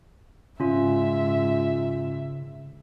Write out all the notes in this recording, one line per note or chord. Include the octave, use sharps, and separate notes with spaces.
G#2 C#3 C#4 F4 E5